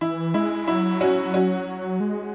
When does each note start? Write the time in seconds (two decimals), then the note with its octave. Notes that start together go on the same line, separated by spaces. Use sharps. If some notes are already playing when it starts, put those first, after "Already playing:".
0.01 E3 E4
0.34 G#3 E4
0.67 F#3 E4
1.01 C#4 F#4
1.34 C#4 F#4
2.00 G#3